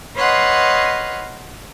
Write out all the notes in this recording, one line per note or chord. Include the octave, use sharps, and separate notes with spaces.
B4 C#5 D#5 F5 F#5 C6